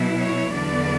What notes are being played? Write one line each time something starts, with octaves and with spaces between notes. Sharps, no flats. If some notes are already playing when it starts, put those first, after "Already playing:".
Already playing: B2 F#3 B3 E4
C#5
E2 D3 F#3 B3 D5